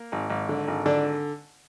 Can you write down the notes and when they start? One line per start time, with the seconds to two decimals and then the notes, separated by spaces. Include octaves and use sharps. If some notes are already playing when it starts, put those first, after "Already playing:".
Already playing: A#3
0.12 G#1
0.30 G#1
0.49 D3
0.68 G#1
0.86 D3 D4